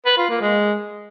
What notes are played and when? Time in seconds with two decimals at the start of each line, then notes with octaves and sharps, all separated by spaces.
0.06 B4
0.18 F4
0.30 A#3
0.41 G#3